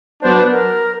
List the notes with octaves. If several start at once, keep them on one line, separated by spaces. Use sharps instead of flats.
F#3 B3 D4 C5
B4
A#4